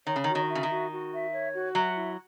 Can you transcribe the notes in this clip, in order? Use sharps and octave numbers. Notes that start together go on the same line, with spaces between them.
D#3 C#5
C#3
D#3
F#4
D#3
E5
C#3
D#3
F#4
F#4
E5
C#5
F#4
F#3 E5
E4